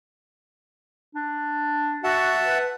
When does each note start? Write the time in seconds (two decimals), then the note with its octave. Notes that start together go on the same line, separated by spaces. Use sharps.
1.15 D4
2.04 F#4 E5 F#5 A5
2.45 B4